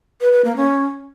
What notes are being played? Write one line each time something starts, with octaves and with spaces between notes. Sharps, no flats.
B4
B4
A#3
C#4